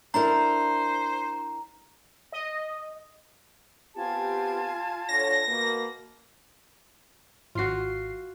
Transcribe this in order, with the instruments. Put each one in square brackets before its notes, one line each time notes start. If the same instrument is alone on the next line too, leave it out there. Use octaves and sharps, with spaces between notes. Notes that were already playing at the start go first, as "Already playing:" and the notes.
[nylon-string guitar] D4 E4 A#4 [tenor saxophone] C5 [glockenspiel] A#5
[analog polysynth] D#5
[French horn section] B3 C4 G4 [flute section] F4 G#5 A5
[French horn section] D3 C#5 [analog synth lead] A#6
[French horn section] B2 A#3
[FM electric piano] G#1 C7 [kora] F4 F#4